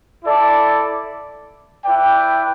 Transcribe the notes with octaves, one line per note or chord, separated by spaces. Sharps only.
E4 A4 D5
E4 B4 D5 G5